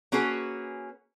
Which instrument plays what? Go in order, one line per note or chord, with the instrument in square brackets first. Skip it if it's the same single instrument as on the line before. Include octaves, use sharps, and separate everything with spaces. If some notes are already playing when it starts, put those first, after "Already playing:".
[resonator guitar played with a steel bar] A#3 C#4 F#4 G#4 B4